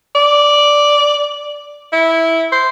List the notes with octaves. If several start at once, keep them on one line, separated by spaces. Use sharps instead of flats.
D5
E4
C5